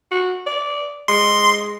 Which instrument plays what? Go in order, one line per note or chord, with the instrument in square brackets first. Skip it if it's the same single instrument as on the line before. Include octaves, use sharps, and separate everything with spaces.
[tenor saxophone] F#4
D5
[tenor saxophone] G#3 [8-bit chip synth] C6